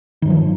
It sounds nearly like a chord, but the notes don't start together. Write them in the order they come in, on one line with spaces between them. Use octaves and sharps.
D#3 G2 F#3 F3